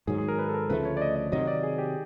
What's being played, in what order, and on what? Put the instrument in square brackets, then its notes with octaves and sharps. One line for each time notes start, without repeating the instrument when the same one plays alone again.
[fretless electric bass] G#2 D#3 F#3 [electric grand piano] G#4
[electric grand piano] G#4
A#4
B4
A4
A#4
[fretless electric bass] D2 C#3 F3 A3 [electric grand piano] B4
[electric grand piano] C#5
D5
D#5
D#5
[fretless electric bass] C3 D#3 F#3 [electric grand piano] D#5
[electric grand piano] D5
G#4
G4